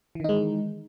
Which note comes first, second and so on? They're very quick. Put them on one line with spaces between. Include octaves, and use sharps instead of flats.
E3 D#3 D#4 G#3